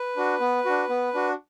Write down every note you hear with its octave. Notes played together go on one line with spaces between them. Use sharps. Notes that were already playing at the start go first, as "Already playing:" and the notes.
Already playing: B4
D4 F#4
B3
D4 F#4
B3
D4 F#4